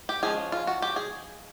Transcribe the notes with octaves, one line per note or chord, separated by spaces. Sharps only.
G4
F3 G#3 C#4 G#4
F4
F#4
G4
G#4